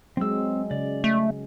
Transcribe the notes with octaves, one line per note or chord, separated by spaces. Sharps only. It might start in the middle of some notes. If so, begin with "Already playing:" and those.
F#3 G#3 C4 E6
C#3 D5
A3